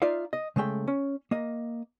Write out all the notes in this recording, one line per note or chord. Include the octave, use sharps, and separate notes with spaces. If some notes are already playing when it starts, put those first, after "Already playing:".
D#4 F4 D5 E5 F5
D#5
C#3 G#3 A3 G5
C#4
A#3 D#5